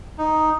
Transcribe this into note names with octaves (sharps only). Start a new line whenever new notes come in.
D#4